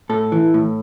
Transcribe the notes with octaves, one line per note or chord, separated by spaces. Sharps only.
A2 A4
E3
A2